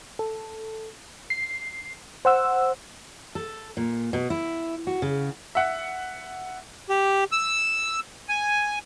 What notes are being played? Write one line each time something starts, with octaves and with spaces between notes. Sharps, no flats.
A4
C7
C5 F#5 E6
A4
A#2
B2
E4
F#4
C#3
E5 F#5
G4
E6
G#5